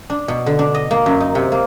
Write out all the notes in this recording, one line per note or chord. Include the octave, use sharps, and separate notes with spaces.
D4
B2
D3
D4
D#5
A#3
F#2
D#4
C3
A#3